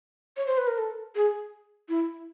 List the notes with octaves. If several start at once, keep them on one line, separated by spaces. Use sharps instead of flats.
C#5
C5
B4
A#4
A4
G#4
E4